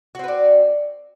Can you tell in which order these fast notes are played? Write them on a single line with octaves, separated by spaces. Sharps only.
F#4 C4 B4 D5